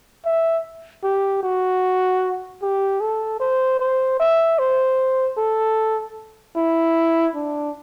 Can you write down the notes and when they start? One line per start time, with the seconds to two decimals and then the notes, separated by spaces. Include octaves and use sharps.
0.25 E5
1.04 G4
1.43 F#4
2.62 G4
3.00 A4
3.40 C5
3.79 C5
4.20 E5
4.59 C5
5.37 A4
6.56 E4
7.35 D4